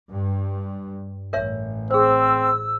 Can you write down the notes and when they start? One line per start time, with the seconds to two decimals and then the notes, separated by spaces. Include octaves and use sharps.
0.11 G2
1.33 A1 A#4 C#5 E5
1.91 C4 G#4 C5 E6